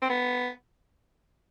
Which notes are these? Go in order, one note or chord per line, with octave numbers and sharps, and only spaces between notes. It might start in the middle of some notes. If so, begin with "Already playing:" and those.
C4
B3